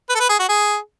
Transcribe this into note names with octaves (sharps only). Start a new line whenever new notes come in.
B4
A4
B4
G#4
F#4
G#4